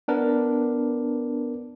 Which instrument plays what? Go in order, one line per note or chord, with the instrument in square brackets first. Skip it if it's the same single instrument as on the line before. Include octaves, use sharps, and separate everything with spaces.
[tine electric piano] B3 D4 A#4 B4